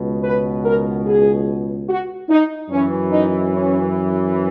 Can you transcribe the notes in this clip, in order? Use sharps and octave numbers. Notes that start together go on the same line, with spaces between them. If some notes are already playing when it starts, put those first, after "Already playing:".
Already playing: C#2 B2
B4
A#4
G#4
F#4
D#4
F#2 E3 C#4
D#4
C#4